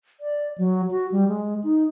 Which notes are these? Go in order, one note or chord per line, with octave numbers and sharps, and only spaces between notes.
D5
F#3
F#4
G3
G#3
D#4